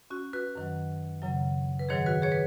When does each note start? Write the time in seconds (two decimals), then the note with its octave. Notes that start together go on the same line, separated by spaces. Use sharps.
0.10 C#4 F#4
0.33 F#4 B4
0.55 F#2 D#3 F#3
1.22 F#2 C#3 F#3
1.79 B4
1.89 G#2 D#3 F#3 G#4 C#5
2.06 F#4 B4
2.22 G#4 C#5
2.32 B4